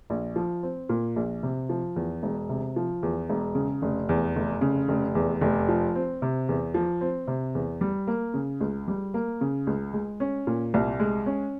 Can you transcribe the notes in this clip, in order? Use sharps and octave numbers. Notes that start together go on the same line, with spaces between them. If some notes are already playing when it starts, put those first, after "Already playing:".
A#1
F3
C4
A#2
A#1
C3
F3
E2
E1
C3
F3
E2
E1
C#3
F1
E2
F1
C#3
F1
E2
F1
F3
C4
C3
E2
F3
C4
C3
E2
G3
A#3
C#3
C#2
G3
A#3
C#3
C#2
G#3
C#4
A#2
C2
G#3
C#4